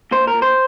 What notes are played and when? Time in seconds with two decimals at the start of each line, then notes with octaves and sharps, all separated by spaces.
0.11 A#2 C5
0.27 A#4
0.34 A#2
0.42 C5